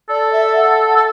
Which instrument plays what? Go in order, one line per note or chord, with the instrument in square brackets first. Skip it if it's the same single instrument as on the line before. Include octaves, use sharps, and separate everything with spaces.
[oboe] A4 [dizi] D5
[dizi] E5
F#5
[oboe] A4 [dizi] A5